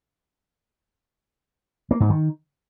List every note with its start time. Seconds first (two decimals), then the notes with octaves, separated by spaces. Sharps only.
1.91 A#3
2.00 G#2
2.10 D#3